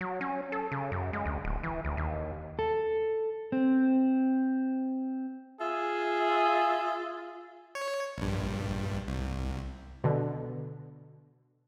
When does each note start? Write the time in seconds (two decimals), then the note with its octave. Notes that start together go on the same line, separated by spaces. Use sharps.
0.01 F#3
0.21 C#4
0.52 A4
0.72 C#3
0.92 F#2
1.13 G#3
1.26 D2
1.45 D1
1.63 E3
1.85 D2
1.97 D#2
2.59 A4
3.52 C4
5.61 F4 G#4 E5
7.75 C#5
8.18 A#1 G2
9.07 C2
10.04 B2 D3